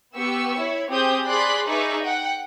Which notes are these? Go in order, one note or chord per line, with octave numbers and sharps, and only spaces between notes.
B3 G4 C#6 E6
E4 C#5
C4 G4 G#4 D#6 G6
G#4 D5 B5 C6 F#6
D#4 G#4 B4 D5 E5 C#6
F#5 G5